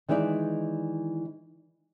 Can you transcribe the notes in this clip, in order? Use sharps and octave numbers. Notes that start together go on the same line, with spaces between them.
D#3 E3 G#3 D#4 D5 E5